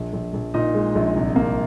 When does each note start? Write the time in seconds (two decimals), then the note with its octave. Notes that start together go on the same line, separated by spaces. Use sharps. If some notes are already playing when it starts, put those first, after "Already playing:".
Already playing: A#1
0.13 A#1
0.33 A#1
0.54 A#2 D#4 D#5
0.74 G#3
0.95 A#1
1.16 C2
1.36 A#3